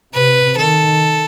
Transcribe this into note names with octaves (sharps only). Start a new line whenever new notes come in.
C3 B4
D#3 A4